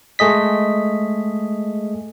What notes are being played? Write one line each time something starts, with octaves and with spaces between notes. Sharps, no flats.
G#3 A3 G#4 D#5 B6